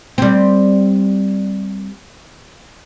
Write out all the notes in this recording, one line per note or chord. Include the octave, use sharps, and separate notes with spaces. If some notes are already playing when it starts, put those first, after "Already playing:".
G3 C4